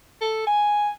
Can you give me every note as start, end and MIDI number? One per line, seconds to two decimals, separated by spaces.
0.21 0.43 69
0.47 0.89 80